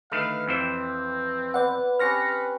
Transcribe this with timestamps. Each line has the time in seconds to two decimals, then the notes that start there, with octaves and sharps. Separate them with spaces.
0.12 D3 D#3 A3 B4 F5
0.47 F2 E3 C4 C5
1.54 B3 D5 F#5
1.99 C4 C#4 G4 B4 F6 A#6 C#7